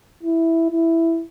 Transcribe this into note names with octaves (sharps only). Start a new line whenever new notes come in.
E4
E4